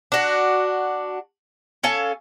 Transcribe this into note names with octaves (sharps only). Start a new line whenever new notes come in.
D4 F#4
C#4 A4 F5 G#5